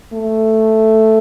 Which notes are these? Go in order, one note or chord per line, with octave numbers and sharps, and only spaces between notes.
A3